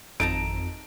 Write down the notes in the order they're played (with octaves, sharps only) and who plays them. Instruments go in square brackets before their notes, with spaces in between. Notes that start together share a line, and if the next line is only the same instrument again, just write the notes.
[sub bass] G#1 [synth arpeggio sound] F2 [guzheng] D#4 A5 A#5 [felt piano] D7